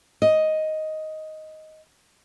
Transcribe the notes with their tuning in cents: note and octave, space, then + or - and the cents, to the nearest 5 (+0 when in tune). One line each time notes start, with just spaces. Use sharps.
D#5 +5